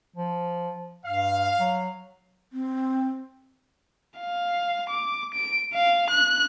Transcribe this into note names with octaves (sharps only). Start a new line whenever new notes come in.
F3
G2 F5
F#3
C4
F5
D6
D7
F5
F#6